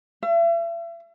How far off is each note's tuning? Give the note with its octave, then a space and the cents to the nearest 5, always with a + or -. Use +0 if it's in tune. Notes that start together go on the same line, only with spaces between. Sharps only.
E5 +40